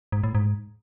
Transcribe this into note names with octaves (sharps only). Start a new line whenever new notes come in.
G#2
A2
G#2